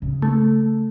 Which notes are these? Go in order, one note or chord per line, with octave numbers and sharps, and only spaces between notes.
C#3
A3